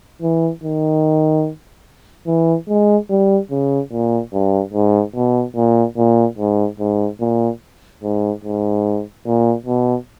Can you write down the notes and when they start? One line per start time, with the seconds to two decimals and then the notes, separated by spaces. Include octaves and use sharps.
0.22 E3
0.64 D#3
2.27 E3
2.69 G#3
3.10 G3
3.51 C#3
3.92 A#2
4.33 G2
4.74 G#2
5.15 B2
5.56 A#2
5.97 A#2
6.38 G#2
6.80 G#2
7.21 A#2
8.03 G#2
8.44 G#2
9.26 A#2
9.67 B2